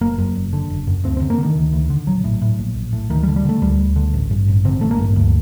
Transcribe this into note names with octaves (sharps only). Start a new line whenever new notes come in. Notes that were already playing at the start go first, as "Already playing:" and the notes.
F#1 A#3
F#2
F#1
D3
F#1
F#2
D2 C4
D3 C4
A#3
D3 D#3
D2
D2
D3
A#1 F#3
A2
A2
A#1
A#1
A2
D2 D#3
G3
D3
G3
D3 A3
D2 G3
D2
D3
A1
G2
A1
D3 C4
A1 A3
A#3
G2
D2